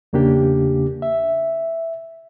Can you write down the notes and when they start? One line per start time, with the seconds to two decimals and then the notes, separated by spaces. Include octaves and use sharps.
0.13 E2 C#3 A#3 D4 G4
1.02 E5